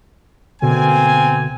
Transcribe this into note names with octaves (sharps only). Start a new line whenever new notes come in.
B2 D3 A#3 C4 G#5